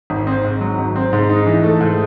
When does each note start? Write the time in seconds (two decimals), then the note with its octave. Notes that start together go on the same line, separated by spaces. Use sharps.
0.10 G#1
0.27 C4
0.44 G#2
0.61 F#3
0.78 G#1
0.96 C4
1.13 G#2
1.29 D#4
1.46 E3
1.63 A3
1.80 G#2